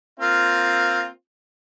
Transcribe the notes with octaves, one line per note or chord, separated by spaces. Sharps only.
A#3 C4 F4